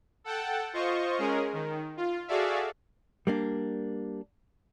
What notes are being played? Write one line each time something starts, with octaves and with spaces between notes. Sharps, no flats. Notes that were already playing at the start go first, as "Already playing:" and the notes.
A4 F#5 G5 A5
F4 C5 D#5 C#6
G#3 C#4 G#4 A#4
D#3
F4
F#4 G#4 A4 D5 E5 F5
G3 A#3 D4